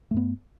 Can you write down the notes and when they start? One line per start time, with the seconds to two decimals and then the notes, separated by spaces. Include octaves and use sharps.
0.11 A3
0.14 G2
0.17 B3